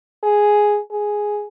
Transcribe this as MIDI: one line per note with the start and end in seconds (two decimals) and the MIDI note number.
0.23 0.78 68
0.91 1.45 68